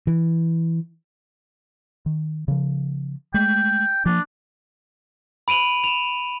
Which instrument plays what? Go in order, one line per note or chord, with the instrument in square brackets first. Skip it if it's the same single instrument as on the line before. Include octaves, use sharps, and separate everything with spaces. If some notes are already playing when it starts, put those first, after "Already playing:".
[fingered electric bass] E3
D#3
C#3 F3
[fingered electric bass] G#3 A3 [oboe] G5
[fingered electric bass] F3 A#3 [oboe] D4
[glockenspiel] B5 D7 D#7 F7 F#7
E7 F7